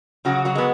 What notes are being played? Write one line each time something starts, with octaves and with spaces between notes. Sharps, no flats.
C#3 F#3 F#4
F#3 F#4
G#3 B3